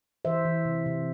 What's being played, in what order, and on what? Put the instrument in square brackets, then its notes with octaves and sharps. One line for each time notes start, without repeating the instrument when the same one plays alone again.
[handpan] E3 C5 E5
E3
C3
C3